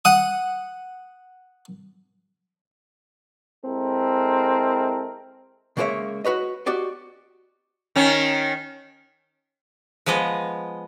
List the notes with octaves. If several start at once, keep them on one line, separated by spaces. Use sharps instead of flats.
F#5 D#6
G#3 C4 E4 A4 A#4
C#3 G#3 A#3 A#4 C#5 E5
F#4 B4 C#5 D#5
F#4 G4 D5 D#5
D#3 C#4
F3 G#3 B3 D#5